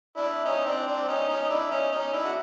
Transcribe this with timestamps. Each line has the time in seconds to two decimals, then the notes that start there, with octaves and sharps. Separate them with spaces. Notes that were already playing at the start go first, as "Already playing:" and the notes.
0.17 D4 E4
0.45 C#4 D#4
0.66 C4 D4
0.87 C4 D4
1.08 C#4 D#4
1.28 C#4 D#4
1.42 D#4
1.49 D4 E4
1.70 C#4 D#4
1.92 C#4 D#4
2.13 D4 E4
2.24 F#4